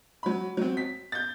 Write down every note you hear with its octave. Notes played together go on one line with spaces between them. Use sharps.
F#3 B5
F#3 C4
B6
G6 A6